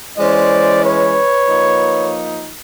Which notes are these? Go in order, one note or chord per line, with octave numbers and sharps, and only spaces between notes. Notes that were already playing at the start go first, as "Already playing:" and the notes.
E3 G#3 C#4 C5 D5
B4 C#5
F3 A#3 D#4